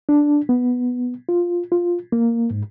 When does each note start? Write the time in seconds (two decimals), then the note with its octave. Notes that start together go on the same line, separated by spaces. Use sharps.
0.09 D4
0.49 B3
1.29 F4
1.72 F4
2.12 A#3
2.51 G#2